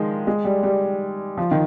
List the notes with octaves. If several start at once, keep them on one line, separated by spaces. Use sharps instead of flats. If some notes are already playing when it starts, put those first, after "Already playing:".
Already playing: D#3 F3 G#3
G#3
G3
G3
F3
D#3